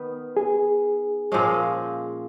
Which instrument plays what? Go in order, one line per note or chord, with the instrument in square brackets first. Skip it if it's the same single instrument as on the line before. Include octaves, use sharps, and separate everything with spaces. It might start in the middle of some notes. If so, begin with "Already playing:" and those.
Already playing: [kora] D#3 B3
[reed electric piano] G#4
[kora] A#2 F3 G#3 C#4